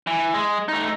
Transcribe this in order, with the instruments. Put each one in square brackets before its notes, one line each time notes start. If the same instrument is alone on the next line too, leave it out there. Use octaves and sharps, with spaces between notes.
[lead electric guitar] E3
G#3
A3 D#4